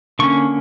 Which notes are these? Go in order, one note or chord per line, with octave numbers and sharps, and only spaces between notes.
D3 A#3 C#4 C#6